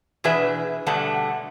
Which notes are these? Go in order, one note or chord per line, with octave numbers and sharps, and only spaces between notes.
B2 E3 D4 G#4 B4 E5
B2 D3 G3 A3 F#5 A5